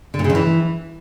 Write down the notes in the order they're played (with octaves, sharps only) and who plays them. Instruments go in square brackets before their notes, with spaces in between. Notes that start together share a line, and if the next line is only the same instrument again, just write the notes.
[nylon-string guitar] D3
A#2
C#3
F2
E3